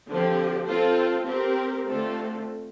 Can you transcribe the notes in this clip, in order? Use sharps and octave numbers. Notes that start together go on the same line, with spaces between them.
D3 F3 C4 G4
C4 F4 A4 C5
C4 G4 A#4
D3 A3 C4 F4 A4